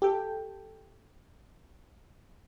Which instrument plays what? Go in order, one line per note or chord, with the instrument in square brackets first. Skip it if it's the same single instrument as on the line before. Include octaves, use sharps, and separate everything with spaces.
[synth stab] G4 A4 G5